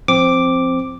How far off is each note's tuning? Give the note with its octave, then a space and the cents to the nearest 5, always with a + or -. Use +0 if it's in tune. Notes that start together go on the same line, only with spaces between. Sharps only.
F3 +0 C4 +0 D6 +0